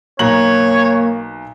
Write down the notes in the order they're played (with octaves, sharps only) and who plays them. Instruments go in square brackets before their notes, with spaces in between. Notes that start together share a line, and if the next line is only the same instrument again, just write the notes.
[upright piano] B1 A#5 F#7 [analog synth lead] A#3 [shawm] C#5